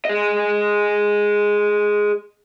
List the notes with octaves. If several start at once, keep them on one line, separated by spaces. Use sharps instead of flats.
G#4 D#5